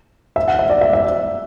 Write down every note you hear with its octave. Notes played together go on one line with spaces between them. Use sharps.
E5
F#5
E5
D5
E5
E5